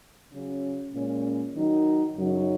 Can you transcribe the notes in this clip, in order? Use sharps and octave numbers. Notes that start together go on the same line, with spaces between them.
C#3 F#3 C#4
A#2 G#3 C#4
D#3 F#3 D#4
F#2 C#3 F#3 D#4